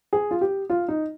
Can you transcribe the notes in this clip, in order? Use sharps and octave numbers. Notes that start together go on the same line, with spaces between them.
G#4
F4
G4
F4
D#4